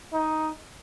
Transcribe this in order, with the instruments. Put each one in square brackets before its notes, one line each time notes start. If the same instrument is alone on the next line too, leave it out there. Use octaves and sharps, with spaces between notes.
[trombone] D#4